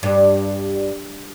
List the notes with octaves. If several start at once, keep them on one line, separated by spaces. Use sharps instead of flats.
G2